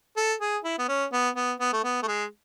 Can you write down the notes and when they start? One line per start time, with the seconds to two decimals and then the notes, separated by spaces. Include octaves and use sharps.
0.17 A4
0.40 G#4
0.64 E4
0.78 B3
0.88 C#4
1.12 B3
1.36 B3
1.60 B3
1.73 A3
1.84 B3
2.03 A3
2.08 G#3